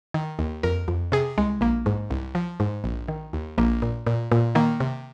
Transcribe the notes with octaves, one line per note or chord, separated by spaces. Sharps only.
D#3
D#2
F2 A#4
F2
C3 G#4
C2 G#3
A#1 A#3
G#2
C2
F3
G#2
A#1
D#3
D#2
A#1 A#3
A#2
A#2
A#2
D#3 A#3
C3